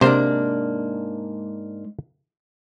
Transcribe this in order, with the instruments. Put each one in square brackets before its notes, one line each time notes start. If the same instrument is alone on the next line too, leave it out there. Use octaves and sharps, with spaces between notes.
[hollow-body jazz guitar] G#2 A#3 D4 [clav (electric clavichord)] C3 C5